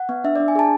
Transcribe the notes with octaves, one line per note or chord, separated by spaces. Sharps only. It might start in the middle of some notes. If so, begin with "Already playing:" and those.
Already playing: F#5
B3
D4 E5
D4 D5
G#5
G#4 A5